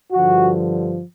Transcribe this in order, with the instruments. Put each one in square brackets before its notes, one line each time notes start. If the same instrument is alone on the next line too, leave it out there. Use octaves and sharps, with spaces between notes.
[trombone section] G2 D3 F3 F#4